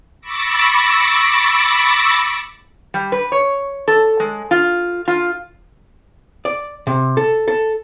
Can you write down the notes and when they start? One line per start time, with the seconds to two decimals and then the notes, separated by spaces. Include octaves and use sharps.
0.21 B5 C#6 D6 E6 A6 A#6
2.94 G3
3.12 B4
3.32 C#5
3.88 A4
4.20 G#3
4.51 F4
5.08 F4
6.45 D5
6.87 C3
7.17 A4
7.48 A4